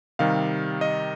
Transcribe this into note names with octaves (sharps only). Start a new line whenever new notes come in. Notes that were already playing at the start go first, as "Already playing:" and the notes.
C3 D#3 G3 F5
D#5